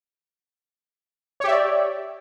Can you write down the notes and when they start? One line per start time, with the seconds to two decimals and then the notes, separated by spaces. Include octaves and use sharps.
1.40 C#5
1.44 G4
1.47 E5
1.51 D5